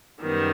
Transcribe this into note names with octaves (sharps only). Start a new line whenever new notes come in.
F#2 D#3 G3 B3